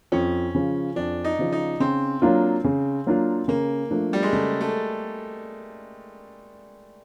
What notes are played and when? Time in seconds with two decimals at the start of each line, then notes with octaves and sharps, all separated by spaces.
0.12 F2 C#4
0.55 C#3 F3
0.96 F2 D4
1.24 D#4
1.39 C#3 F3
1.52 D#4
1.80 C#3 C4
2.22 F#3 A#3 D4 F4
2.64 C#3
3.06 F#3 A#3 D4 F4
3.48 C#3 A#3
3.91 F3 A3 D4
4.13 G3
4.23 G#3
4.32 C#3 A3
4.61 A3